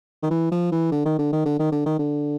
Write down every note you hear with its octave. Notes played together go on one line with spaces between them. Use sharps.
D#3
E3
F3
E3
D3
D#3
D3
D#3
D3
D#3
D3
D#3
D3